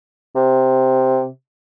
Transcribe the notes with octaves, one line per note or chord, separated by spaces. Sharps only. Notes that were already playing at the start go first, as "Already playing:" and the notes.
C3